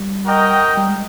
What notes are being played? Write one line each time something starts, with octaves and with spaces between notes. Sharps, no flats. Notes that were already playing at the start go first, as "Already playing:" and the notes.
Already playing: G3
F#4 A#4 D#5 G5
G3
G#3